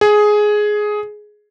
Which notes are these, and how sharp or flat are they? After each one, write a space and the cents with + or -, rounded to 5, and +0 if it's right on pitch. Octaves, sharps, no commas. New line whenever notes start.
G#4 +10